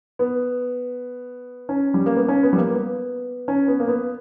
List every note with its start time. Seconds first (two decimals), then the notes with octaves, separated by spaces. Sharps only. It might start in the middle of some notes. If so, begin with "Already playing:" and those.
0.19 B3
1.69 C#4
1.94 G3
2.06 A#3
2.16 B3
2.28 C#4
2.43 B3
2.53 G3
2.58 A#3
2.73 B3
3.48 C#4
3.68 B3
3.80 A#3
3.88 B3